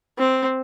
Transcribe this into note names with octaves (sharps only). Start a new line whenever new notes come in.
C4